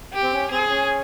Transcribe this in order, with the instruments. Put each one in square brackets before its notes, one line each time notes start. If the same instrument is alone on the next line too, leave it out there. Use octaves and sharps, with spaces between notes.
[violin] G4
[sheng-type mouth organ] C4
C#4
[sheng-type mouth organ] C4 [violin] G#4
[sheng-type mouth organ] C#4